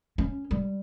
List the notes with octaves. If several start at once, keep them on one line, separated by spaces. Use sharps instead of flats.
C#4
G3